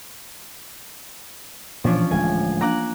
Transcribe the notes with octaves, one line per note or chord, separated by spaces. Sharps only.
A#2 E3 F3 C#4 D4
D1 G#3 A3 G#5
A#3 D4 F5 A#5 D6 F#6